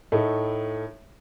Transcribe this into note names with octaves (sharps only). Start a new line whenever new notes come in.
A2 A3 D#4